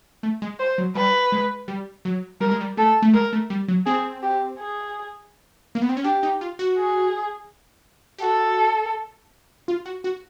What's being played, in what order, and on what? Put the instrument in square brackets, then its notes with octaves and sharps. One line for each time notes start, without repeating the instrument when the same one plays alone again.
[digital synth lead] A3
G#3
[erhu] C5
[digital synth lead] F#3
[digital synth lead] G3 [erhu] B4
[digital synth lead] G#3
G3
F#3
[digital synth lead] G3 [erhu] A#4
[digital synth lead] G#3
G3
[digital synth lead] A3 [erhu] A4
[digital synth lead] A3
[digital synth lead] G#3 [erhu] A#4
[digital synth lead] A3
G3
F#3
[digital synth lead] C4 [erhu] G#4
[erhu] G4
G#4
[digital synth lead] A#3
B3
C4
C#4
[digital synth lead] D4 [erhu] G4
[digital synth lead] D#4
F4
F#4
[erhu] G#4
[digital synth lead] G4
[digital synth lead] F#4 [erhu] A4
[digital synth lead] F4
F#4
F#4